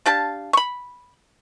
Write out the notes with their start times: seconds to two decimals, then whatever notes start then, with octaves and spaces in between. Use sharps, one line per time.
0.06 D4 G4 F5 A5
0.53 B5 C#6